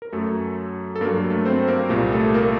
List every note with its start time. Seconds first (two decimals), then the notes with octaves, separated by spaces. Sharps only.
0.02 A#4
0.13 F#2 F#3 A3 A4
0.96 A4
1.01 G2 A#3 A#4
1.05 F#3
1.30 A3 A4
1.45 C4 C5
1.67 A#3 A#4
1.90 C2 A#2 G3 G4
2.12 A3 A4
2.34 A#3 A#4